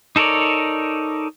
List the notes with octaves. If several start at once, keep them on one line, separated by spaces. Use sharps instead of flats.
D#4 A4 A#4 C#5 D5